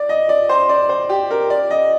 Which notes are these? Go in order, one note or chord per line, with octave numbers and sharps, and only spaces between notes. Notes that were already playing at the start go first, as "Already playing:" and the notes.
Already playing: D5
D#5
D5
C5
D5
C5
G4
A#4
D5
D#5